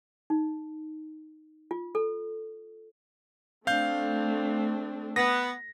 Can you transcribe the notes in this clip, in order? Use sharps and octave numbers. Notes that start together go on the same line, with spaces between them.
D#4
F4
A4
A3 C4 D4 F5 G6
B3 A#6